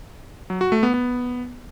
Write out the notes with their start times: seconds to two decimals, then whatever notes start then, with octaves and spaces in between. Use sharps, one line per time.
0.50 F#3
0.61 F#4
0.72 A3
0.83 B3
0.94 B3